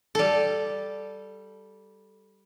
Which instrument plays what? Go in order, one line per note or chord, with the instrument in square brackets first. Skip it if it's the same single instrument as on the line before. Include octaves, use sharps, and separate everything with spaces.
[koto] G3 A4